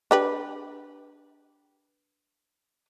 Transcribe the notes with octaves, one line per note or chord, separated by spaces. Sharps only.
D4 G4 B4